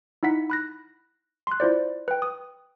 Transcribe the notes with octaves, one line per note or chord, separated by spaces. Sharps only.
D#4 E4 F#5 B6
B5 F#6 A#6
C6 F#6
E4 F4 C5 D5
B4 G5
D#6